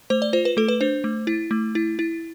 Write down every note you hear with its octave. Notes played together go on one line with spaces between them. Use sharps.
A3 C5
D5
F4 C5
B4
A3 A4
B4
D4 C5
A3
E4
A3
E4
E4